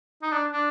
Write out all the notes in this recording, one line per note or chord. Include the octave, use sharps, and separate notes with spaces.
D#4
D4
D4